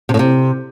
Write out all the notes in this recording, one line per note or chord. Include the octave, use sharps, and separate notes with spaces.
C3
A2
C3